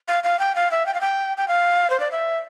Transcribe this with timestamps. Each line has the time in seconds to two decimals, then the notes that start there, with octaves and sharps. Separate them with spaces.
0.08 F5
0.24 F5
0.39 G5
0.56 F5
0.71 E5
0.86 G5
0.94 F5
1.01 G5
1.37 G5
1.48 F5
1.90 C5
2.00 D5
2.12 E5